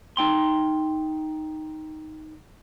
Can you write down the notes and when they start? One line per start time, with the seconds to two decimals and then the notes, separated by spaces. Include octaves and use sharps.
0.17 D#4 G5 C6